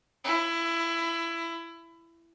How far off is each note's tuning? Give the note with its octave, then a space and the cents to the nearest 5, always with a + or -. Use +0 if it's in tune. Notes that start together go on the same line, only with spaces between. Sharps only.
E4 +20